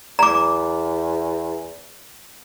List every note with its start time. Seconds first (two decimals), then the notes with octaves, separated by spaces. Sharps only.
0.19 E2 A#5 D6